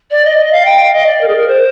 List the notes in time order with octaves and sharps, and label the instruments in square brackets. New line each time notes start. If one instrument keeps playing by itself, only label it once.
[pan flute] D5
D#5
D#5
F5
G5
F5
D#5
D5
A#4
G#4
A#4
C5